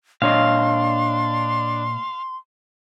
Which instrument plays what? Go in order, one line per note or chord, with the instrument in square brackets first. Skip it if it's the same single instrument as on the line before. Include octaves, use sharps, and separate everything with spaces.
[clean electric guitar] A#2 C#5 D#5 [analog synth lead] D4 [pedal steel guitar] F5 [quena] C6